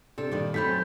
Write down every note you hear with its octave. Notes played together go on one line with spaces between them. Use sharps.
C3 D4 A4
G2 A#2 D#3
F#2 A3 C4 C#4 A4 B5 G6 B6